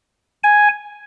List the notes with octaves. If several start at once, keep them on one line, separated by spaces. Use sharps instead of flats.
G#5